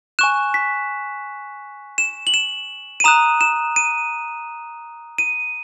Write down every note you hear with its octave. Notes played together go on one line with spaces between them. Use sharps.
G#5 C#6 F#6 E7
B6
E7
F#7
E7
D#7
A#5 D#6 F#6 E7
E7
D#7
D#7